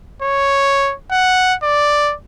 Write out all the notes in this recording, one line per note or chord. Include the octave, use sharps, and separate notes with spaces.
C#5
F#5
D5